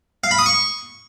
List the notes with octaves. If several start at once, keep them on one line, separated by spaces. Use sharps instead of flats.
F5
B5
D#6
C#6